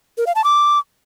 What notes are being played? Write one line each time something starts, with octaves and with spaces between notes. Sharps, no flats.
A#4
F5
A5
D6